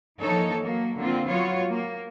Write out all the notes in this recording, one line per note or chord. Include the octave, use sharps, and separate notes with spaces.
E3 F3 A#3 D#4 A4 C#5
F#3 A#3
D3 A#3 C4 F4
F#3 B3 F4 F#4 C#5
A#3